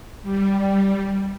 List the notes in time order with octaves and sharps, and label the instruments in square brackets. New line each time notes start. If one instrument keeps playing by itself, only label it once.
[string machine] G3